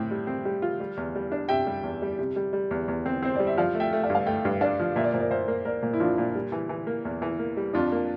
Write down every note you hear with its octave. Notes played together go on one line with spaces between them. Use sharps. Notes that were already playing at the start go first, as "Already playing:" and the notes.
Already playing: A2 C4 E5 G5
G3
C4
G3
F4
G3
E2
G3
D4
C3 E5 G5
G3
E2
G3
C3
G3
G3
E2
E2
C4
C4 C5
G3 D5
E5
F3 D5 F5
A3
E5 G5
A3
D5 F5
G2
F5
A3 E5 G5
G2
D4 D5 F5
F3
A#2 E5
D5
A#2 C5
A#4 D5
A#2 C5 E5
A#3
A#3 A#4 D5
A#2
E4
F3 D4 F4
A#2
G3
E3
E3
A#3
E2
E3
A#3
G3
F2 D4 F4
A#3